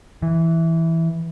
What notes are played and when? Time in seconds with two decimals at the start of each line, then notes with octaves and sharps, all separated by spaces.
0.22 E3